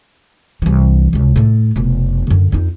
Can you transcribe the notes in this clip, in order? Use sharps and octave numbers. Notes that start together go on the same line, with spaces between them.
C2 E3
C#2 C3
A2 A3
F1 B2
F#2 D3
F2 D#4